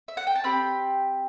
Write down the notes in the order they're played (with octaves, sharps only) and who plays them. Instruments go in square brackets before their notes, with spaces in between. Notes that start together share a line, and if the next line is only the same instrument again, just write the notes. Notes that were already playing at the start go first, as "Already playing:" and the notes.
[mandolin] E5
F#5
G5
A5
C4 G4 B5